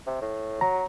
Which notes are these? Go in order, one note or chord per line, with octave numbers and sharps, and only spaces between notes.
C3
A2
F#3 A#5